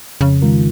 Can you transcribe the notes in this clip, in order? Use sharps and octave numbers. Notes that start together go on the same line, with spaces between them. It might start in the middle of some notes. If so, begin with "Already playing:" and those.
F2 C#3
D#3 G#3 F4 A#4